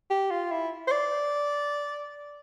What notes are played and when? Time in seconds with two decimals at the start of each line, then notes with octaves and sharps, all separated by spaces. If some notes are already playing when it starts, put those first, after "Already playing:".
0.10 G4
0.31 F4
0.51 E4
0.88 C5
0.92 D5